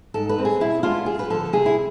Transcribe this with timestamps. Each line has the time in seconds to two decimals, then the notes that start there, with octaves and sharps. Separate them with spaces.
0.14 G#2 A4
0.29 B4
0.38 G#3 C4
0.45 G#4
0.61 B2 E4
0.83 G#3 B3 D4 F4
1.06 F2 G#4
1.19 B4
1.30 D3 F3 A4
1.53 C3 G#4
1.66 E4